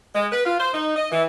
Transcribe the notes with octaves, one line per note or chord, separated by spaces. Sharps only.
G#3
B4
F4
C5
D#4
D#5
E3